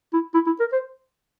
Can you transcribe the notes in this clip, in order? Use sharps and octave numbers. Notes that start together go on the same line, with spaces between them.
E4
E4
E4
A#4
C5